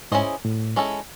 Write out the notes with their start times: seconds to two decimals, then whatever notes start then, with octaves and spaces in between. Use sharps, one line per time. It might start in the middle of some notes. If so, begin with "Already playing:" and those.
0.12 G#2 C#4 E4 G#4 C5 D#5
0.45 A2
0.76 G#3 C#4 E4 A4